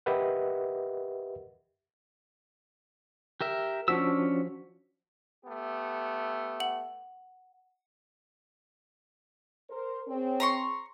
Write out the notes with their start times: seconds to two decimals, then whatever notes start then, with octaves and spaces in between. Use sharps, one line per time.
0.06 G4 A#4 B4 D#5 E5 F#5
3.41 G4 A#4 E5
3.88 F3 C#4 D4 F#4 E6 B6
5.45 A3 B3 G4
6.60 F#5 F#7
9.70 A#4 C5
10.07 C4 G#4 C#5
10.40 A#5 C6 C#6